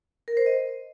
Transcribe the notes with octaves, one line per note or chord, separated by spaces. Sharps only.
A#4
C5
D#5